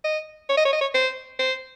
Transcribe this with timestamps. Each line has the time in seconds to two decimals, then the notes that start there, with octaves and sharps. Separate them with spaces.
0.04 D#5
0.49 C#5
0.57 D#5
0.65 C#5
0.73 D#5
0.81 C#5
0.94 C5
1.39 C5